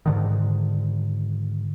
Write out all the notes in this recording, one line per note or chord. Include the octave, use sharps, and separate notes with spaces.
G#2 D3 D#3